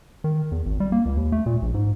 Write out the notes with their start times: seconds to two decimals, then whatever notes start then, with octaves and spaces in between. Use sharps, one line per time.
0.24 D#3
0.52 E2
0.66 G#1
0.80 G3
0.92 A#3
1.05 C#2
1.17 D#2
1.32 A3
1.46 A#2
1.62 A#1
1.74 G#2